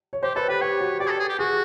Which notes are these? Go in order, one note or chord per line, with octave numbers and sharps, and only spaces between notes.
C#5
G4 C5
A4 B4
G4 B4
G4 C#5
F#4
G4 D5
G#4
A4
G#4
G4
F#4 G#4